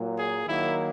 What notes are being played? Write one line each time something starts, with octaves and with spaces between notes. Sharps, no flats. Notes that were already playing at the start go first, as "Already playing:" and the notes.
Already playing: A#2 F#3 A#3
G#4
D#3 F#3 A#3 E4